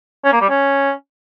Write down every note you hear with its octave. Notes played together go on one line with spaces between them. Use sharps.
C#4
A#3
G3
C#4